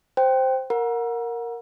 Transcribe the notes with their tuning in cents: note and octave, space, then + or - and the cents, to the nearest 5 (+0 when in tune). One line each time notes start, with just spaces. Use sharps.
C5 +0 G5 +0
A#4 +0 F#5 -25 A#5 +35